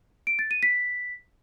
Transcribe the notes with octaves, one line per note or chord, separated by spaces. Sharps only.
D7
A6
D#7
B6